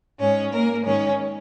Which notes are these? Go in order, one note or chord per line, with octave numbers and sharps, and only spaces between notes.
G#2 G#3 C#4 C#5
A#3 A#4
G#2 D#3 G#3 C#4 C#5